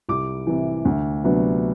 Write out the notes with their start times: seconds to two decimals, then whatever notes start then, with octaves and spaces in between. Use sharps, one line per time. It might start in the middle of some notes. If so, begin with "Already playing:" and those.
0.09 C2 D6
0.47 C3 E3
0.85 D2
1.24 C3 F#3 B3 D4